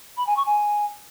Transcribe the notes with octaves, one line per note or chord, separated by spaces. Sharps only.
B5
G#5
C#6
G#5